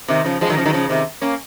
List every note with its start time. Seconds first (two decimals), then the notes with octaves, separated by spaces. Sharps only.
0.08 C3 D#3
0.25 C#3 F3
0.41 F3 G#3
0.50 D#3 F#3
0.57 C#3 F3
0.65 D#3 F#3
0.73 C#3 F3
0.89 C3 D#3
1.22 A#3 C#4